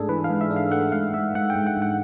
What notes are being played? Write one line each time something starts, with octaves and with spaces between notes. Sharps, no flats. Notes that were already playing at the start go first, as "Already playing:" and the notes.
Already playing: G#2 A3 D4 G#4 A4
E3 B4
F5
G#2
E5
D4
F5
A3 F#5
G#2 F5
G#2 E5
G#2 F#5
G5
G#2
F#5
G#2
F#5